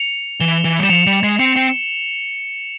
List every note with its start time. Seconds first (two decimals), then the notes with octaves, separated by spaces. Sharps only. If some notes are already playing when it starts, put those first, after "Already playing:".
Already playing: C#7 F7
0.40 E3 E7 G7
0.64 E3
0.79 G3 E7
0.89 F3 C#7 F7
1.07 G3
1.23 G#3
1.39 C4 C#7 F7
1.56 C4